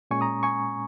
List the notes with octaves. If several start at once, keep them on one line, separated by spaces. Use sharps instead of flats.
A#2 G#3 C#4 G#5 C#6
A#5 D#6
G#5 C#6